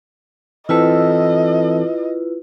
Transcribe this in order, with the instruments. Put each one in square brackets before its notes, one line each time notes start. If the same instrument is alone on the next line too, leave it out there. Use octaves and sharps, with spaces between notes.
[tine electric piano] E3 C4 A4 [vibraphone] E4 F4 B4 [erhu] D#5